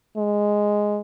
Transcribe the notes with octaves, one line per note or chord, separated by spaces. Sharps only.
G#3